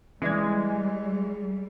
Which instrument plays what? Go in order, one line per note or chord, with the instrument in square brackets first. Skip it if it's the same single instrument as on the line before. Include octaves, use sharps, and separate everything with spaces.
[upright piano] E3 D5 G#6 [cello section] G3 [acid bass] G#3